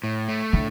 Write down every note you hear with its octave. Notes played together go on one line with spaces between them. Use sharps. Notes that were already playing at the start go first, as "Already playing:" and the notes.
A2
A3
A2 D3